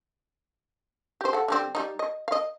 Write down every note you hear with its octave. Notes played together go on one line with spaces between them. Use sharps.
G4 C5
A4 F#5
D3 G3 C4
G3 D#4
D#5
D#5 F5